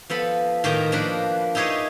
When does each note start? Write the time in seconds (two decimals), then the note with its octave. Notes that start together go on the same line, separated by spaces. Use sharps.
0.10 F3 B3 A4 B5
0.64 A2 D#3 G4 G5 A#5
0.92 F3 A#3 D4 B4
1.55 D#4 E4 G4 G#4 C#5 D#5